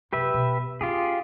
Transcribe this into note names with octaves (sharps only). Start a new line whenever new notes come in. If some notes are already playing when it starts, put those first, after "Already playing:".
F#2 C3 G4 B4 E5
B2
C#4 F4 G4 G#4